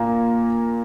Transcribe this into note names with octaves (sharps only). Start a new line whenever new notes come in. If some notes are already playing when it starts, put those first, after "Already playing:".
Already playing: A#2 A#3